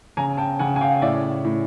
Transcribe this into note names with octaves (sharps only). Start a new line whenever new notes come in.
C#3 G#5 A#5
G5 A5
C#3 F#5 G#5
G#5
F5 G5
A2 D5 E5
A2